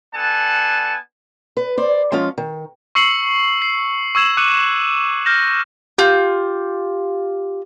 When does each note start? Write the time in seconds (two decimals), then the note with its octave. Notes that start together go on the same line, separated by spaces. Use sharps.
0.14 B3 D4 A4 F#5 G#5 A5
1.57 B4
1.77 C5 D5
2.12 F3 G#3 C#4 F4 F5
2.38 D#3
2.95 C#6 E6 C7 C#7 F#7
3.62 C7
4.15 C#6 E6 G#6 E7 F#7
4.37 D6 F#6 C#7 D#7
5.26 F6 G6 A#6 E7
5.98 F4 G4 G6